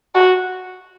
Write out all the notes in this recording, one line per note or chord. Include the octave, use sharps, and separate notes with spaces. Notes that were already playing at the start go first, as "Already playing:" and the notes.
F#4